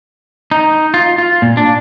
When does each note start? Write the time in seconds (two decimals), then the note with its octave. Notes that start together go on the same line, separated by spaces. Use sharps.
0.51 D#4
0.94 F4
1.18 F4
1.42 A#2
1.57 D4